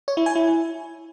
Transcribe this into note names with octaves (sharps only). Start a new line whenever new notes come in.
C#5
E4
G#5
E4